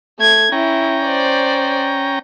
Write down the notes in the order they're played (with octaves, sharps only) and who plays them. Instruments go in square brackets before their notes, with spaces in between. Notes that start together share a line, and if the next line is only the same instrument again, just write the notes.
[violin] A3 G#6
[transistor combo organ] C#4 G5 A#5 [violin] E4
[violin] C5 D5